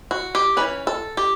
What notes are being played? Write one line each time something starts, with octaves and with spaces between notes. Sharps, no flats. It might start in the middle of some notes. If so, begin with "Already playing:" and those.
F#4
G4
E3 A3 C#4 B4
A4
G4